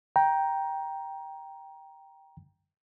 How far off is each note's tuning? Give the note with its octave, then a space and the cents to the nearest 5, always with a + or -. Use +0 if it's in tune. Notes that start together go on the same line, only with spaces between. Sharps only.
G5 +0 A#5 +15